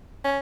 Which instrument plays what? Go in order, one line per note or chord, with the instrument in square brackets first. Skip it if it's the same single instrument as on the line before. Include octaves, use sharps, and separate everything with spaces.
[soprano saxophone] C#4